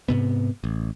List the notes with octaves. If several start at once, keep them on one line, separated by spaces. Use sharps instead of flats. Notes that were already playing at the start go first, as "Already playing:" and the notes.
G#2 C3 B3
A1